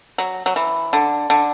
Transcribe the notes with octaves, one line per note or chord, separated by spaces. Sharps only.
F#3
F#3
E3
D3
D3